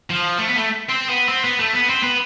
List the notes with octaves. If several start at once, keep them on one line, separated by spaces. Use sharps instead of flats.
F3
A3
B3
A3
C4
B3
C4
B3
A3
B3
C4
B3